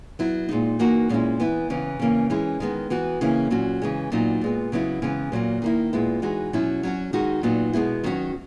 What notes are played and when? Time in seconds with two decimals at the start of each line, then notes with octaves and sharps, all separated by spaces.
0.19 F#3 B3 E4
0.49 A#2 G#3 D#4
0.79 E3 A#3 D#4 F#4
1.09 A#2 G#3 C#4 E4
1.40 E3 B3 E4
1.70 C#3 E3 B3
1.99 C#3 E3 A#3 C#4
2.30 E3 G#3 C#4 E4
2.60 D#3 G#3 B3
2.90 E3 B3 F#4
3.21 C#3 E3 A#3 C#4 E4
3.50 A#2 F#3 C#4 F#4
3.82 C#3 E3 G#3
4.12 A#2 F#3 B3 D#4
4.41 A#2 G#3 B3
4.72 C#3 F#3 B3 E4
5.02 C#3 E3 G#3 B3
5.32 A#2 F#3 A#3
5.62 D#3 A#3 E4
5.93 A#2 G#3 B3 E4
6.22 E3 G#3 D#4 F#4
6.53 B2 F#3 C#4 E4
6.83 F#3 C#4 F#4
7.13 D#3 G#3 D#4 F#4
7.43 A#2 F#3 B3 D#4 F#4
7.73 B2 G#3 B3 E4
8.04 D#3 F#3 C#4 F#4